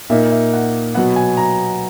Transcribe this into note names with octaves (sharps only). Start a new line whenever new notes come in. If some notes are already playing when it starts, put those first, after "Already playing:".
A#2 A#3 D#4 E5
E5
F#5
B2 F#3 B3 F#5
G#5
A#5